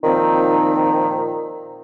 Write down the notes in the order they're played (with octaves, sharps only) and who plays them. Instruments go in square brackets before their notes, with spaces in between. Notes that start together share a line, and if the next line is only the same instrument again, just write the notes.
[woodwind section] A#2 D#3 F3 C4 D#4